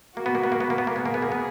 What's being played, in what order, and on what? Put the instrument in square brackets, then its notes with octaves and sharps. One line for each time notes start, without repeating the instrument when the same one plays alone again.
[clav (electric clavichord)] A#3 [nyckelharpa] F#4
[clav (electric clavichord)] B3
A#3
B3
A#3
B3
A#3
B3
A#3
[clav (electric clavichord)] B3 [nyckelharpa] G#4
[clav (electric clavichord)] A#3
B3
A#3
B3